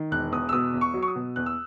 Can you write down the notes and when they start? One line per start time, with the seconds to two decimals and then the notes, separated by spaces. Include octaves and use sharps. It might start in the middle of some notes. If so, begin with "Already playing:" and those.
Already playing: D#3
0.11 E1 F#6
0.32 E2 D#6
0.49 E6
0.53 B2 D#6
0.74 E2
0.81 C#6
0.94 F#3
1.02 C#6
1.08 D#6
1.16 B2
1.36 E2 F#6
1.46 E6